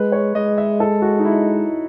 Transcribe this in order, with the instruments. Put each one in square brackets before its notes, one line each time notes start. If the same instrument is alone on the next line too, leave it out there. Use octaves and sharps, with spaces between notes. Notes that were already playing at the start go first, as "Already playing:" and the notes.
Already playing: [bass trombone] G#3 [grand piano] B4
[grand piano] C#5
[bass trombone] G#3 [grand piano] D#5
[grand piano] E5
A4
F#4
D#4
E4